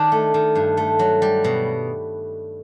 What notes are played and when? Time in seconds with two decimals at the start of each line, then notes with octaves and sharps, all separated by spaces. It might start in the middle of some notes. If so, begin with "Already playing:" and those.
Already playing: D#3 D4
0.12 A3
0.34 D#3
0.55 G2
0.77 A3
0.99 F#3
1.22 G3
1.44 B2